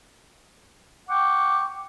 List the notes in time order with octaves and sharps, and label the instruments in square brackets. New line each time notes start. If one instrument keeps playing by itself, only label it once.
[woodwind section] F#5 G5 C#6 D6